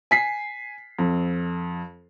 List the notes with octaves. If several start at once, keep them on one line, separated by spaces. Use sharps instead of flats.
G#5 B6 C7
F2